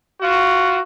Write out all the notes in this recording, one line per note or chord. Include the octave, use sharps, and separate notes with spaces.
F4 F#4